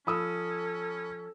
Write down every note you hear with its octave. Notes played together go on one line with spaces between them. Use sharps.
F3 C#4 A4 B5 D#6 E6